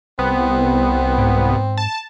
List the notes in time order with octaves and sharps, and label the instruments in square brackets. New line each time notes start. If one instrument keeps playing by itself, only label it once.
[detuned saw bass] C2 [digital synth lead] B3 [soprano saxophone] C4
[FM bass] G#2
[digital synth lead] A5